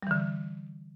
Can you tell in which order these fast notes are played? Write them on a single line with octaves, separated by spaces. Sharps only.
G3 E3 D3